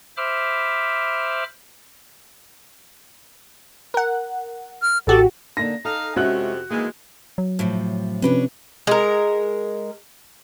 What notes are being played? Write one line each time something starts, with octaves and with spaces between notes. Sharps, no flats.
C5 E5 B5 D6 F6
A#4 F#5
F6
A1 F#4 G4 A4
D3 A#3 D#4 A#6
D#4 A4 F5
F2 C3 G#3 C#4 F#4 E5 F#6
D#3 E3 G#3 A#3
F#3
A2 C3 F3
C3 F3 C#4 D4 B4 C#5
G#3 A#4